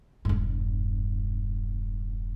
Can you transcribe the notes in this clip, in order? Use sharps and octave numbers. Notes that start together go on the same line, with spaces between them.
E1 G2